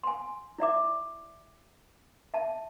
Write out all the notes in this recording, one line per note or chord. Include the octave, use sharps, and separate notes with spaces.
G#5 C6
E4 D5 E5 D6
E5 A5